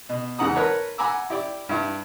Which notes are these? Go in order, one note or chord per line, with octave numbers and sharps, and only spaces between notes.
B2
E2 G#2 C#3 F#5 A#5 D#6
A#4 B4 C#5 A5 A#5
F#5 G#5 A#5 B5 D6 E6
E4 G4 D5
G2 E4